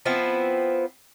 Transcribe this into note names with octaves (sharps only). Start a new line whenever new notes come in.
F3 B3 C4 E4